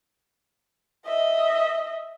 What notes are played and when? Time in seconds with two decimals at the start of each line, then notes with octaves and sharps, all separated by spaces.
1.06 D#5 E5